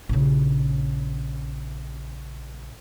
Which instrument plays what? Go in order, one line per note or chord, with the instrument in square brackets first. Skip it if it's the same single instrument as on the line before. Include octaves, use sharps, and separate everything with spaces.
[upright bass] A#1 C#3